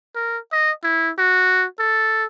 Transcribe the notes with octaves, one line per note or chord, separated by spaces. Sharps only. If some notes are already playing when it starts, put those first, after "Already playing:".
A#4
D#5
E4
F#4
A4